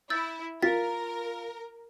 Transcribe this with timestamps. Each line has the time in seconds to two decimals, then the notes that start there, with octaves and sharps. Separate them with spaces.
0.10 E4 E6 G6 A6
0.62 F4 A#4 A6 B6